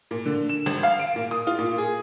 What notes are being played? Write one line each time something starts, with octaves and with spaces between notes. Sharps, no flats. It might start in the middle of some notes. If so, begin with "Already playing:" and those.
A#2
D3
E7
G#1
F5
D7
A#2
D#6
F4
A#2
G#4